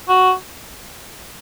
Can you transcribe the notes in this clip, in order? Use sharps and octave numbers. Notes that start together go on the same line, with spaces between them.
F#4